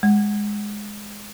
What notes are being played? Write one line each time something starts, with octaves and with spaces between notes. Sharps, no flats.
G#3